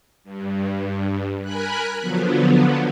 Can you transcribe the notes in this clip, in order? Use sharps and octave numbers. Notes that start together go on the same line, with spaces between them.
G2
A#4 G#5 B5 F#6
D3 F3 F#3 B3